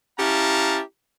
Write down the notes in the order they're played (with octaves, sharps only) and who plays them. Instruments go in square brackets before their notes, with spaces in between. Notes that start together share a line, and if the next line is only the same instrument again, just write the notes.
[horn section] C#4 E4 G4 F5 A5 A#5